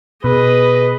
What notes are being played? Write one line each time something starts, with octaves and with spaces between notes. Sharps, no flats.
B2 G#4 B4 D#5